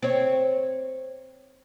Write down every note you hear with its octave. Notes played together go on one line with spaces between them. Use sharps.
C4 C#5